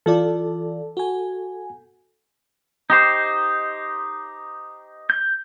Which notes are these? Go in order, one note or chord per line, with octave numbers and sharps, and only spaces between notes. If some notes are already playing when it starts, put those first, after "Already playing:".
E3 F4 A4 D5
F#4 G#5
D#4 G4 C5
G6